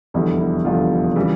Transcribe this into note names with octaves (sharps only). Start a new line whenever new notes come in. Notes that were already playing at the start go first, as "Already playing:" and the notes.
F1 E2 D3 G3 E4
E4
F1 E2 D3 G3 F4
C#3 E3 G3